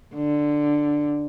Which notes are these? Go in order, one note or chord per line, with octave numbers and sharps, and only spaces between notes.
D3